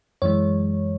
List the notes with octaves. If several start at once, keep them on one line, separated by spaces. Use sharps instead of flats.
F#2 E3 G#3 C#5